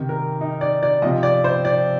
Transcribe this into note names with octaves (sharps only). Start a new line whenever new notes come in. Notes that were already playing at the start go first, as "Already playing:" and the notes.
Already playing: C3 D#3
A#4
D#4
D5
D5
C3 F3 D#5
D5
C5
D5